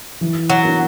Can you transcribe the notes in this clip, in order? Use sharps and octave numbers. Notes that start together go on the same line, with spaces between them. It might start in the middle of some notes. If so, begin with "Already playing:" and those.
E3
F#3
B3 D4 F#4 A#4